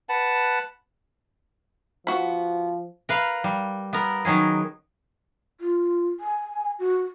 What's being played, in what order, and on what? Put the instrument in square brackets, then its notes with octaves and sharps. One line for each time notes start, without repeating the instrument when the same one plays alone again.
[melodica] B4 F#5 A5
[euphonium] F3 [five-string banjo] B3 F#4 B5
[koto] A#4 B4 F5
G3
B3 A#4
D#3 F#3 C#4 G#4
[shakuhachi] F4
G#5
F#4